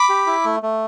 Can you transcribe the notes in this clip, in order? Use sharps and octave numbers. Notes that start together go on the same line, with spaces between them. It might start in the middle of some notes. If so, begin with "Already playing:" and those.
Already playing: B5 D6
G4
E4
A3
A3